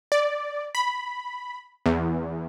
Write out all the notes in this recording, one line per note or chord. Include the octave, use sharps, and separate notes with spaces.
D5
B5
E2